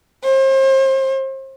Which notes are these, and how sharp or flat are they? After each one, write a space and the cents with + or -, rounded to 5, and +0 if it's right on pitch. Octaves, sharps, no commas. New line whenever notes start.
C5 +35